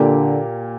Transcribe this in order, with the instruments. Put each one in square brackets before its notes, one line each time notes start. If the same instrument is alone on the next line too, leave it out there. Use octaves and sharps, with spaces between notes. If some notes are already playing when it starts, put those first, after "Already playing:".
Already playing: [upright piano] A#2 A#3 G4 [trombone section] D3